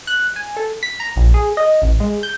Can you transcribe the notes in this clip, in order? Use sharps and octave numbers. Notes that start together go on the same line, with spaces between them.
F#6
G#5
A4
B6
A#5
A#1
G#4
D#5
A1
G#3
G6